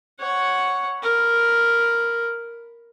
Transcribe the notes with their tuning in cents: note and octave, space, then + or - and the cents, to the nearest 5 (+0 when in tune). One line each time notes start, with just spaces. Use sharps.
C#5 +0 F#5 +0
A#4 +0 B5 +0